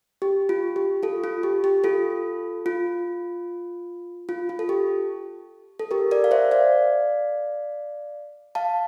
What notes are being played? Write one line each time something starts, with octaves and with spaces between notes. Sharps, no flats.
G4
F4
G4
F4 A4
F4
G4
G4
F4 A4
F4
F4
F4
A4
G4
A4
G4 A#4
A#4 D5
F5
C5 E5
D5 F5
F5 A5